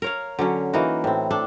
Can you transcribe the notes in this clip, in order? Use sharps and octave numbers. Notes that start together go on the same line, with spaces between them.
A#4 C#5 F5
D3 F#3 C#4
E3 A#3 D#4 F#4
A2 C4
D4 A4